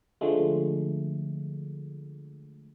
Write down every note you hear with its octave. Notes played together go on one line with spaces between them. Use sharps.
D3 F3 G#3 A3